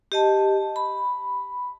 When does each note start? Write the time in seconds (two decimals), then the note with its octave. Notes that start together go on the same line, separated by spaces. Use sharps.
0.12 G4 D#5 A5
0.76 B5